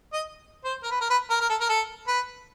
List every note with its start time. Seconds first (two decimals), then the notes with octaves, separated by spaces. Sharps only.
0.13 D#5
0.64 C5
0.83 A#4
0.91 B4
1.01 A#4
1.10 B4
1.30 A#4
1.40 A#4
1.49 A4
1.61 A#4
1.69 A4
2.08 B4